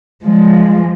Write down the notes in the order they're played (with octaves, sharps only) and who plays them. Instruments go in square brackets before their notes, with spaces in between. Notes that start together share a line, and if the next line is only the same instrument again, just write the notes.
[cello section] F3 G#3